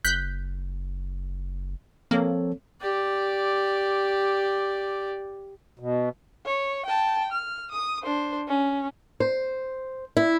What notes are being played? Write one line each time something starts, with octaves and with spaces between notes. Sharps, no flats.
F#1 F#6 G6 B6
F3 A#3 C4 A4 C#5
G4 D5
B2
C#5
G5 A5
F6
D#6
D4 C5
C#4
C5
E4